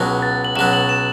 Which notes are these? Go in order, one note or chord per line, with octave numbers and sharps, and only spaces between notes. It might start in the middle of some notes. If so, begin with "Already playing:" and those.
Already playing: C#2 B2 F#3
A6
F#7
C#2 B2 F#3 E7
F#7
E7